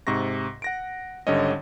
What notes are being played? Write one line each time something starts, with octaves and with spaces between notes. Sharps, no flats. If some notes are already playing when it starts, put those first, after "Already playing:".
G#2 C3 C#6 A#6
F#5 A#6 D7
G#1 D3 G3 C#4 C#5 D#5